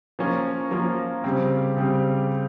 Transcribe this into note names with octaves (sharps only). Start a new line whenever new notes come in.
F3 A#3 C#4 F4 A#4
F3 A#3 C#4 F4 A#4
C#3 G3 C4
C#3 G3 C4